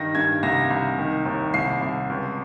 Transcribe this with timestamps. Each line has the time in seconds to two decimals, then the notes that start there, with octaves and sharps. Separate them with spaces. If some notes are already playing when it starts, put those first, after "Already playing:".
Already playing: G2 D#3 A#6
0.15 G2 G#6
0.43 C2 A#6
0.70 C2
0.98 D#3
1.25 D#2
1.54 C2 C7
1.81 C2
2.10 C#2